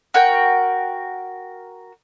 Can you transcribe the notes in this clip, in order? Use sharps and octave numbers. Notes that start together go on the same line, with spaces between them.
F#4 A#4 G5